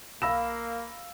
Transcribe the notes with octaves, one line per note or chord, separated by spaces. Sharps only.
B1 A#3 F5 B5 E6 A#6 E7